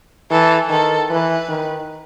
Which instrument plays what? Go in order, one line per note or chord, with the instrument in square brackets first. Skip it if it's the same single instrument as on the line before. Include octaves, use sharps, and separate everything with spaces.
[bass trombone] E3 [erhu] A4
[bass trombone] D#3 [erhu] A4
[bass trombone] E3 [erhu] B4
[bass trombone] D#3